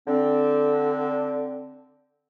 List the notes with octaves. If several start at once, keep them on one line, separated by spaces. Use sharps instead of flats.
D3 C4